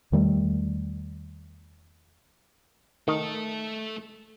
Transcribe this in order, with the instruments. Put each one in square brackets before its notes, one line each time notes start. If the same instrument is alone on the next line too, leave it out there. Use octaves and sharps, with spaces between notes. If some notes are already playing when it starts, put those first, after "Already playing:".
[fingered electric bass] E2 D#3 G3 A3
[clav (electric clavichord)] D#3 [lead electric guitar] A3 A4